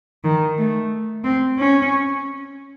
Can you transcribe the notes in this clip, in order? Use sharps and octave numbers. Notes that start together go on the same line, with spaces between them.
D#3
A3
C4
C#4